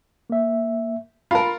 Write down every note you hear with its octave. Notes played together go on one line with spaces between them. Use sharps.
A#3 E5
F4 A#4 F5 B5